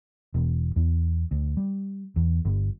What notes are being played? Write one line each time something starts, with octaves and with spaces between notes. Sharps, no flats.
E1
E2
D2
G3
E2
G1